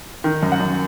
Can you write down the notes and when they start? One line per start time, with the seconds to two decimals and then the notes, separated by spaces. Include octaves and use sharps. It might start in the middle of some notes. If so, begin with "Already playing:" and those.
0.24 D#3
0.43 F#2
0.52 F#5
0.60 F#2